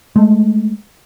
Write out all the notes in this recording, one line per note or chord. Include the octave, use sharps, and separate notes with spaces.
G#3 A3